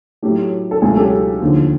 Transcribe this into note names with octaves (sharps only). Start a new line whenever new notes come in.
A2 F#3 A3 G4
A4
C#2 B2 F#3 A3 G#4
G4 A4
D#2 D3 F3